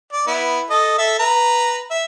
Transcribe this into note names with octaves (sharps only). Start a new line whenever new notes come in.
D5
B3 E4
A4 D#5
A4 E5
B4 A#5
E5